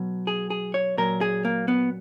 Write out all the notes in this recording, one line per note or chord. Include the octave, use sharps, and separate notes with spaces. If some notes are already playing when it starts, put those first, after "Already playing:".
Already playing: B2 F#3
G#4
G#4
C#5
A#2 F#3 A#4
G#4
A#3
B3